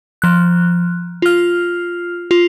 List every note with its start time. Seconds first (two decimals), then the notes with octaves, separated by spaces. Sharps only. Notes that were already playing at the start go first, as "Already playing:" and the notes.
0.22 F3 F#6
1.22 F4 F6
2.31 F4